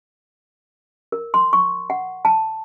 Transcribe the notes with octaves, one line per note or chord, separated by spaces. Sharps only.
A#4
C6
C#6
F#5
A5